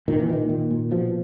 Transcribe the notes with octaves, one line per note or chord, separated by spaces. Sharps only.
A#2 D#3
E3
A#2 D#3
A#2
A#2
B2 F3